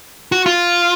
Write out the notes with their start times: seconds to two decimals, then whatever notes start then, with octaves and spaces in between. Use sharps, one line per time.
0.32 F#4
0.46 F4